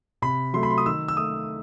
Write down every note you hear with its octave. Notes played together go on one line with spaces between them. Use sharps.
C3 B5
F#3 A3 C6
B5
C6
D#6
D#3 E6
E6
A3 D#6